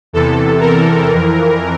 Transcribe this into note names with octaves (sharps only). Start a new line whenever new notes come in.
E2 C3 E3 A4
A#4
F2 E3